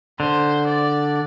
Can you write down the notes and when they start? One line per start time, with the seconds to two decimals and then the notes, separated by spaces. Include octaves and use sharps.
0.19 D3 C5
0.67 D5